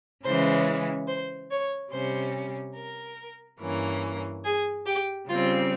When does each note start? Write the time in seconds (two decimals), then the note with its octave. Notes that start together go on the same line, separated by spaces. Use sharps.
0.24 C#3 E3 G#3 C#4 C5
1.08 C5
1.50 C#5
1.92 C3 G3 C#4 C5
2.76 A#4
3.60 G2 E3 A#3 C#4
4.44 G#4
4.86 G4
5.28 C#3 G3 C4 F4